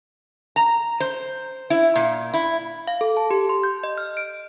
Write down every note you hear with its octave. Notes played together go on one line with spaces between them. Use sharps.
A#5
C5
E4
A#2
E4
F5
A4
A5
G4
C6
G6
D#5
F6
D7